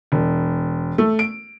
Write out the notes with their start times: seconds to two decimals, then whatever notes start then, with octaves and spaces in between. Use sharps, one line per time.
0.12 E1
0.98 A3
1.19 D7